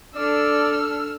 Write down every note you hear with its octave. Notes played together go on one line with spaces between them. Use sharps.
D4 A4 D5 E6 F6